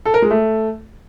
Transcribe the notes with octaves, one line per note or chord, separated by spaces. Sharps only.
A4
A#4
G#3
A3